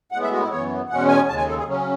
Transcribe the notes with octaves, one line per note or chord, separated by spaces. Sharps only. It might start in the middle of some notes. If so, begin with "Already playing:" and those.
A2 G#3 B3 F#5
E5
F#4
E4
F#2 E3 B3 C#5
E2 B2 G#3 C#4 F#5
G#5
D#2 C#3 G#3 A5
G#5
A4
G#4
C#3 F#3 C#4